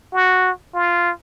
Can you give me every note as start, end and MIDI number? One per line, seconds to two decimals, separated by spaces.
0.13 0.51 66
0.74 1.12 65